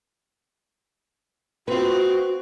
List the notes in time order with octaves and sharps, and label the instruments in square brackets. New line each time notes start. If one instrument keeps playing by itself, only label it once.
[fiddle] C4 [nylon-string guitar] F4 B4 [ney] F#4